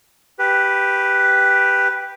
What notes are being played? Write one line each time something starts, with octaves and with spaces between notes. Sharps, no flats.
G4 B4